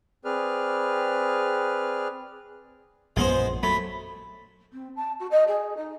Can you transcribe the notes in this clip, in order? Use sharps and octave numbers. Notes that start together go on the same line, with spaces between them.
C4 G#4 B4 D5 F6
A#1 F#2 F3 G#3 B3 C5
F#3 A3 B5
C4
A5
F#4
D#5
G#4
D#4